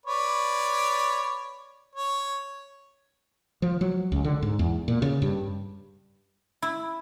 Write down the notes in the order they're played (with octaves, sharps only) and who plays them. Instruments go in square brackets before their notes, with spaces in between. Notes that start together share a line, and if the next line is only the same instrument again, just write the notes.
[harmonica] B4 C#5 D5
C#5
[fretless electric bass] F3
F#3
C#2
D3
G#2
E2
A#2
C#3
G2
[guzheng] E4